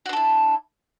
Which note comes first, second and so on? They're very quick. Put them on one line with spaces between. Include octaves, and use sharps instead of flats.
F#4 D4 A4 E4